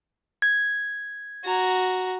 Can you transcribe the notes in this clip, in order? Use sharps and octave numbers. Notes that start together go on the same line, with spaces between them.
G#6
F#4 A#5